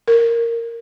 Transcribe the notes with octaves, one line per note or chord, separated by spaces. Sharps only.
A#4